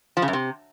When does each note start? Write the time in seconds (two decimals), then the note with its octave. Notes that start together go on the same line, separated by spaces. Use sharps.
0.17 F3
0.22 C#3
0.28 F#2
0.33 C3